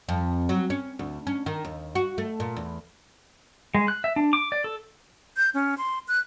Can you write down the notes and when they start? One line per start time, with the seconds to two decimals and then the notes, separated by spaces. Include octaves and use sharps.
0.09 F2
0.49 F#3
0.70 C#4
0.99 D2
1.27 C#4
1.46 D#3
1.65 D#2
1.95 F#4
2.18 A3
2.40 A#2
2.57 E2
3.75 G#3
3.88 F#6
4.04 E5
4.16 D4
4.33 D6
4.52 D5
4.64 A4
5.36 G6
5.54 C#4
5.78 C6
6.08 F#6